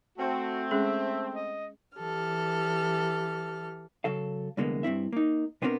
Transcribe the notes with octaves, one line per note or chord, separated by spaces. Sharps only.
A3 C4 F#4
G#3 C#4 G#4 E5
D#5
E3 G4 A4 F6
C#3 F#3 A4 F5
C2 F2 D3 G#3 A#3 B3
G2 C4 E4 E5
A#3 D#4
B2 B3 C4 D4 F4 A#4